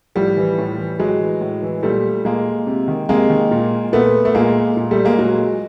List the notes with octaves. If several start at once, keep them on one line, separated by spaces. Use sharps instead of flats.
A2 F3 G3
E3
A2
E3
A2 F#3 G#3
E3
A2
E3
A#2 G3 A3
A#2 G#3 A#3
C3
D#3
C3 G#3 A#3
D#3
A#2
A#2 A3 B3
A3
A#2 G#3 A#3
A#2
G3 A3
G#3 A#3
A#2 F#3 G#3